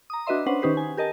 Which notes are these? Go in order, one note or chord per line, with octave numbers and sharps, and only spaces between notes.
A#5 D#6
D4 F#4 B4 D#5 E5 C6
C#4 D4 B4 C5 F#5
D#3 C#4 D#4 G4 B4 C5
G#5
G4 A#4 D#5 A5